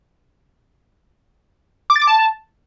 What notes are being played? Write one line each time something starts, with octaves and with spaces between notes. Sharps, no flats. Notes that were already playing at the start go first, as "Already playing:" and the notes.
D6
A6
D6
A5